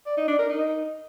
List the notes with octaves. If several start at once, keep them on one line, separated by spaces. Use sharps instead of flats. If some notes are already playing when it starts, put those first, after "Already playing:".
D5
D#4
D4
A#4
D#4